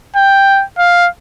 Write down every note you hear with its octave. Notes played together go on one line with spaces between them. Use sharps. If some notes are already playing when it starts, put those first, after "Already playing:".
G5
F5